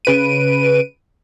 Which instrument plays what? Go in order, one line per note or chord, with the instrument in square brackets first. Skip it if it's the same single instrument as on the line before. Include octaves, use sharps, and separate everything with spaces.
[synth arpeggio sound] C#3 B4 D7 D#7